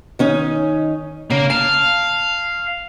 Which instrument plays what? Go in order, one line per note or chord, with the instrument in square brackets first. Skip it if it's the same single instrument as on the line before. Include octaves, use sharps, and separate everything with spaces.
[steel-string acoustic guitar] D#3 C#4 D#4
[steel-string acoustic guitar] C#3 [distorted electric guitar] A#3
[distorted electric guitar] F5 [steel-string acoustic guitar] A5